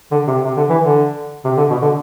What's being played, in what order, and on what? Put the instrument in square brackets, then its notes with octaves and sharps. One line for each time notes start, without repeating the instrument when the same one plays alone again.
[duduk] D3
C3
C3
D3
E3
D3
C3
D3
B2
D3